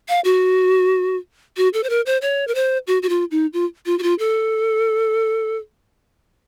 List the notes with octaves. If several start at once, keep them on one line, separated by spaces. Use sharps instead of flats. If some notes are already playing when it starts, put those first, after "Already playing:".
F5
F#4
F#4
A4
C5
A#4
C5
C#5
A#4
C5
F#4
F#4
F4
D#4
F4
F4
F#4
F4
A4